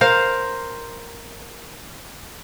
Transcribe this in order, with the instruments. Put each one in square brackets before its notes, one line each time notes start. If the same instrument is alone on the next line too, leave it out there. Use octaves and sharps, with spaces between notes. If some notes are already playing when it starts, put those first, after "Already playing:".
[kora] A#4 C5 F5